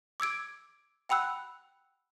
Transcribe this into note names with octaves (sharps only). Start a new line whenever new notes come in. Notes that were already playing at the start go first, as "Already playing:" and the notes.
D6 E6 G#6 D7
F#5 G5 B5 E6 F#6